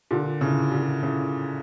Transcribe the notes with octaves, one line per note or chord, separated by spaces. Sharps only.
A#2 D3
A2 C#3
A#2
A2 C#3